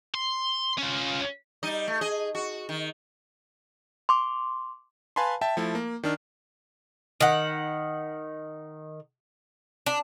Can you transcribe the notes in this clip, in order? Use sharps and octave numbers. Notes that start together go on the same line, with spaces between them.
C6
C#4 F4
G3 D#4 D#5
A3
G#4 D#5
F#4
D#3
C6 D6
B4 F5 G#5 A5 B5 C6
E5 G5 A5
F3 A3 E4
A#3
D#3 D4 F6
D#3 F#5
D4